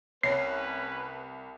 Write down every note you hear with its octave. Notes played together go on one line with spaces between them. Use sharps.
C2 A3 C#4 B4 C#5 C7